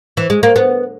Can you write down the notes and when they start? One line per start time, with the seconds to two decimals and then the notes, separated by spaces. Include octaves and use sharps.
0.17 E3
0.30 G#3
0.43 A#3
0.56 B3